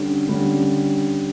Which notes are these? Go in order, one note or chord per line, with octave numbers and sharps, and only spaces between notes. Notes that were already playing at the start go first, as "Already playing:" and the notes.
Already playing: D3 G3 C#4
D3 G3 C#4